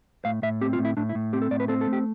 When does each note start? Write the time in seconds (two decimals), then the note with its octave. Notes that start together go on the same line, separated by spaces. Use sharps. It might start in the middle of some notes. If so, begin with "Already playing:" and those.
0.25 A2 F5
0.43 A2 E5
0.61 C4 G4
0.73 F4
0.79 A2
0.85 E4
0.97 A2 D4
1.09 E4
1.15 A2
1.33 C4 G4
1.42 A4
1.51 A2 D5
1.60 B4
1.68 C4 A4
1.81 A4
1.87 A3
1.93 G4